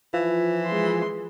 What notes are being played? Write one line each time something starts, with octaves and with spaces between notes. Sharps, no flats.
E3 F3
G#3 C6